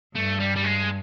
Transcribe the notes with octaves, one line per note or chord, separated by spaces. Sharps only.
G2 A3
G3
G3
G#3